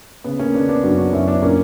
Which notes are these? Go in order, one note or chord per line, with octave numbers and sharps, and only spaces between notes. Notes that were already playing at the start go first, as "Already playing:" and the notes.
C#3 B3
A#3 C#4
C#3 B3 D4
B3 D4
F#2 D4 F#4
D4 F#4
F#2 C#4 E4
B3 D4
A#2 A#3 C#4